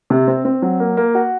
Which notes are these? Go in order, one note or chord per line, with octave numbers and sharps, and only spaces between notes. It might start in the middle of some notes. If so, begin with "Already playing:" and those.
C3
C4
C4
F#3
A#3
A#3
F#4